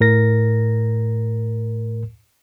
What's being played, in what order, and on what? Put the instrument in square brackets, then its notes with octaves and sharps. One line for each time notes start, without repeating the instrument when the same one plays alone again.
[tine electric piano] A2 A#4 A#6